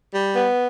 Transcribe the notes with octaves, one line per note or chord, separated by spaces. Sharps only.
G3
B3